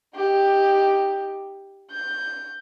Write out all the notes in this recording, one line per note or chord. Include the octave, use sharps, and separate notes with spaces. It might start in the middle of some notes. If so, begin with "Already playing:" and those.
D#4 G4
G6